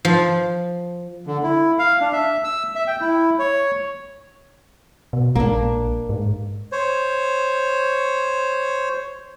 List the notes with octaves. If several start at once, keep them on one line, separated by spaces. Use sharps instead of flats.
F3
D3
E4
F5
D4
E5
E6
E5
G5
E4
C#5
B2
A#1 A#3 D4
G#2
C5 C#5